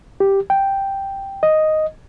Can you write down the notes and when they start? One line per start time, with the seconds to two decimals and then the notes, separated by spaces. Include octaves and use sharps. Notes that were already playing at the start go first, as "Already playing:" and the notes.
0.20 G4
0.50 G5
1.43 D#5